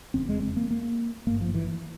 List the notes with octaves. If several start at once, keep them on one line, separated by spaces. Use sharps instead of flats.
F1 E2 C#3 C4
G#3
C4
A#3
A#3
G#1 G2 A#3
F3
E3